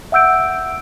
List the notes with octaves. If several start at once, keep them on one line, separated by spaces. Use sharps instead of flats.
E5 F#5 E6 G6 D7